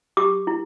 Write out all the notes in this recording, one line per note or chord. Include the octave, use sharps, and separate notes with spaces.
G4 D6
E4